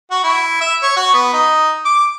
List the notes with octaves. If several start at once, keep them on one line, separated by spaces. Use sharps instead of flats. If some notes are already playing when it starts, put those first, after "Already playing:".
F#4
E4
E5
C#5
F#4
B3
D#4
D6